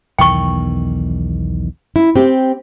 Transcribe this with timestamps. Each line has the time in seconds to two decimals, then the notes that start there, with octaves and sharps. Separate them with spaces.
0.19 B1 E2 D#3 G5 C#6
1.96 E4
2.16 C4 G4